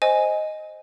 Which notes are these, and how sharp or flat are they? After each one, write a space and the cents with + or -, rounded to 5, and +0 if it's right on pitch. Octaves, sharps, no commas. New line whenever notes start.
C5 +0 D#5 +0 G#5 +0